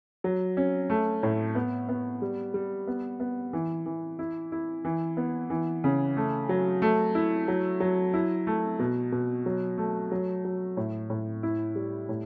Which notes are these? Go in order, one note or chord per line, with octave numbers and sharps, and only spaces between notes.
F#3
C#4
A3
A2
B3
B3
G3
G3
B3
B3
E3
E3
E4
E4
E3
B3
E3
C#3
A3
F#3
A3
E4
F#3
F#3
E4
A3
B2
B2
F#3
A3
F#3
F#3
A2
A2
E4
G3
A2